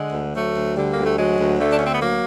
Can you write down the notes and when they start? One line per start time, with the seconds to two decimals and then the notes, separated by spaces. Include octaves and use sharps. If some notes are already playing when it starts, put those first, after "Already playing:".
Already playing: D3 G#3
0.13 D2
0.34 F#3 A3
0.55 D2
0.75 D3 G3
0.91 A#3
0.96 D2
1.04 A3
1.16 F#3 G#3
1.37 D2
1.58 D3 A3
1.70 D4
1.78 D2 C#4
1.85 C4
1.92 B3
1.99 F#3 A#3